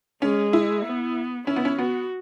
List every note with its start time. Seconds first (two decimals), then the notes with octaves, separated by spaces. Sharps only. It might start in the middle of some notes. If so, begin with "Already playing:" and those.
0.22 G#3 C#4
0.53 E4
0.85 B3
1.47 C#4 E4
1.56 B3
1.65 C#4
1.78 B3 F#4